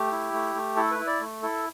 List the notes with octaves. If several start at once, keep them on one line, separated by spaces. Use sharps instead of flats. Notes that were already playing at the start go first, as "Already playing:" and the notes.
Already playing: A3 G4
E4
A3
A3
E4 A4
B4
E4
D5
A3
E4 A4